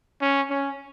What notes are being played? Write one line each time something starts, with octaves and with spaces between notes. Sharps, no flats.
C#4
C#4